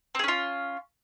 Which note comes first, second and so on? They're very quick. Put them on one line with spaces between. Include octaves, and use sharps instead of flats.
C4 G#4 C#4 F4